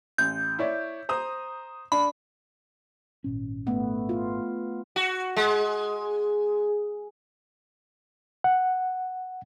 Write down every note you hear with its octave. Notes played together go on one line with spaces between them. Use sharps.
A1 G6
E4 C#5 D5
C5 A#5 D#6
D4 B5
G#1 A#2 C#4
A3 B3
F4
F#4
G#3
F#5